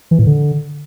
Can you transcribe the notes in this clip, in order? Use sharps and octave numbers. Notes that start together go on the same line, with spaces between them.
E3
A2
D3